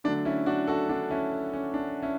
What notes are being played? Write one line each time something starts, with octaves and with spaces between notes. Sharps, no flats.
D3 F#3 A3 D4
C#4 E4
D4 F#4
F#4 A4
D4 F#4
C#4 E4
C#4
D4
C#4 E4